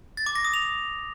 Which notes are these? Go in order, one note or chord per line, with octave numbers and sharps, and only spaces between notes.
A6
D6
A#6
D#6
F7